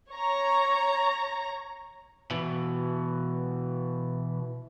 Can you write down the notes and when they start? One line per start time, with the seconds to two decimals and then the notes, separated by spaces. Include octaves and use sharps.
0.11 C#5 A#5
2.31 B2 E3